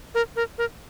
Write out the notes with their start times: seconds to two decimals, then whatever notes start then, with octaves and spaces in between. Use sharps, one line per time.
0.15 A#4
0.36 A#4
0.58 A#4